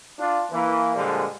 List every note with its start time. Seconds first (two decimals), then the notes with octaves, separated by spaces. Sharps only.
0.19 D4 F4
0.51 E3 A#3
0.96 A#2 D3 F3 G3 G#3